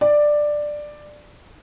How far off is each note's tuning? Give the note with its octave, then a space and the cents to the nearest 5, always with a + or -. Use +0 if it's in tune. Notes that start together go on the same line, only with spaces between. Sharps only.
D5 +10